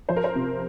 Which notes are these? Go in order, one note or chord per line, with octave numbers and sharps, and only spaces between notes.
F3 C5
A#4
C5
C3